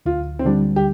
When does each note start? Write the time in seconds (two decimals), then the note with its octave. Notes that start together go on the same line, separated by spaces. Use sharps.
0.06 D2 F4
0.39 C4
0.45 D3 G3 D4
0.76 G4